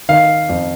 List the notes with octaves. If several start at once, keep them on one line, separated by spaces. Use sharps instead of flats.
D#3 F5
F2